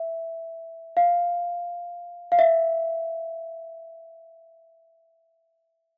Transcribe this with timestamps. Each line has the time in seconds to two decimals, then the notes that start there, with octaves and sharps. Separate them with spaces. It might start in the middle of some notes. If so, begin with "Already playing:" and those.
Already playing: E5
0.97 F5
2.32 F5
2.39 E5